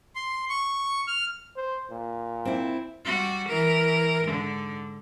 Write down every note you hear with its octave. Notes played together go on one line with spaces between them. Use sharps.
C6
C#6
F6
C5
A#2
C4 E4
G3 F#4
E3 A#4
G#2 D3